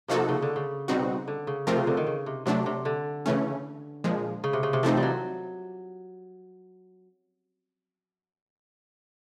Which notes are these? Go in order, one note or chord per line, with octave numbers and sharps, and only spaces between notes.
C3 F3 A#3 D#4 F#4 A4
C#3
D3
C#3
B2 G3 C4 D#4 F#4
D3
C#3
C3 F3 A3 C4 F4 A#4
C#3
D3
D#3
C#3
C3
C3 F#3 A3 D4
C3
D3
C#3 E3 A3 C#4
A#2 F3 G#3
C#3
C3
C#3
C3
E3 F3 A3 C4 D#4
G3
F#3